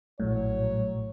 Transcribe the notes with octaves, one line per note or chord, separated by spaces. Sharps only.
A#1 A2 F#3 C#5